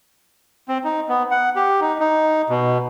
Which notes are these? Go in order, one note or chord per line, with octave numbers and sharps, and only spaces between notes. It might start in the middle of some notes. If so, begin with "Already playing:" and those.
C4
D#4
B3
F#5
G4
D#4
D#4
B2